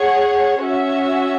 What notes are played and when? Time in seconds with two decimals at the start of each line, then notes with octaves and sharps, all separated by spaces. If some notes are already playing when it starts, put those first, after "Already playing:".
Already playing: G#4 C#5 F#5
0.61 C#4 F#4 E5